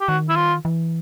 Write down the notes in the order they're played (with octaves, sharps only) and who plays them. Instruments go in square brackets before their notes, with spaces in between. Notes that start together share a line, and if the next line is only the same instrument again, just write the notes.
[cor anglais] G4
[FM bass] D#3 [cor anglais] F#4
[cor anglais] E4
F4
[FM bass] E3